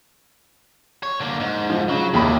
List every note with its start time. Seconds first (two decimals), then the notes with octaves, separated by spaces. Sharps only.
1.03 C#5
1.21 D3 A#3
1.40 G#2
1.70 F3
1.89 C#3 F#3
2.14 D#2 A2 C3 B5